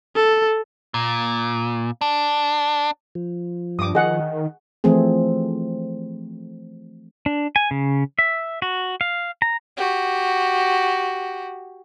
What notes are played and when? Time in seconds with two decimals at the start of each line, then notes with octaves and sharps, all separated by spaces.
0.16 A4
0.94 A#2
2.01 D4
3.15 F3
3.79 G2 D6 D#6
3.95 D#3 G#4 D#5 F#5
4.84 E3 F3 A3 C4 G#4
7.26 D4
7.56 G#5
7.71 C#3
8.19 E5
8.62 F#4
9.01 F5
9.42 A#5
9.77 F#4 G4